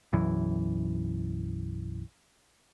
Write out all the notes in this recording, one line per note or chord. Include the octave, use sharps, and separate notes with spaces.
B1 F#2 E3